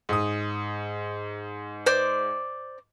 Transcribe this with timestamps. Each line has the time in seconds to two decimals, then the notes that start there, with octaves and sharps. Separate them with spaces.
0.09 G#2 D#6
1.86 C5 D5 D6